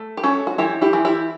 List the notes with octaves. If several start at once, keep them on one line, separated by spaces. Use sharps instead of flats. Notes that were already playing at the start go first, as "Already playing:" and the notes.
Already playing: A3
G4
C#4 F#4 A4
F#4
E3 E4 G4
E4 G4
E3
E4 G4